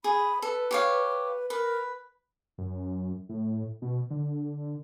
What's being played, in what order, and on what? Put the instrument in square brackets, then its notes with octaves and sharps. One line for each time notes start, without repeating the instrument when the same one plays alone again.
[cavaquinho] G#4 [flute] B5
[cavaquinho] A4 [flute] B4
[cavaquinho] G4 C#5 F5
[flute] A#4 [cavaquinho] B4
[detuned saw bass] F#2
A2
B2
D3